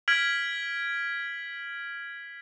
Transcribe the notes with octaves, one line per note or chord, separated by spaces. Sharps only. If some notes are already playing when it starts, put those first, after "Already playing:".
F6 G#6 B6 D7 F#7